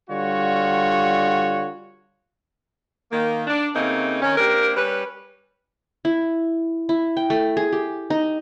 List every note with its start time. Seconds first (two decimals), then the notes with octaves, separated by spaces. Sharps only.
0.10 D3 G3 F4 F#4 C#5
3.12 D#3 A#3
3.47 D4
3.76 C#3 A3 A#3 C4 D#4
4.22 D#3 C#4
4.37 A#3 C4 D4 G4 A#4
4.75 G3 C#4 B4
6.05 E4
6.89 E4
7.17 G5
7.30 A3
7.57 G#4
7.73 G4
8.10 D#4